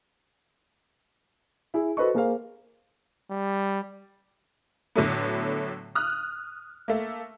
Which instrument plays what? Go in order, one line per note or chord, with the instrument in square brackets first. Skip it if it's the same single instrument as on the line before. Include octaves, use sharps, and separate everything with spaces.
[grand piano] E4 G#4
F#4 A4 B4 C5 D#5 C#6
A#3 G#4 A#4 C5 F5
[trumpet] G3
[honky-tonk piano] A2 D3 F#3 A3 B3
D#6 F6 F#6
A3 A#3